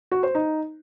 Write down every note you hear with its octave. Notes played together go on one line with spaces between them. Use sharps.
F#4
C5
D#4